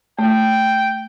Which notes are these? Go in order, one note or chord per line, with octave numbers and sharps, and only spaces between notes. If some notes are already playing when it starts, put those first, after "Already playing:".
A3 G5